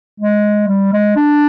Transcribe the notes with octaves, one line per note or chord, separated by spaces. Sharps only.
G#3
G3
G#3
D4